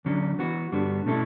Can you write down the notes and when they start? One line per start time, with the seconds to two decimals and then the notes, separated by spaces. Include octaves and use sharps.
0.05 D2 D3 F#3 C#4
0.39 E3 B3 F#4
0.72 G2 D3 G3 B3 F#4
1.06 B2 A3 C#4 E4 A4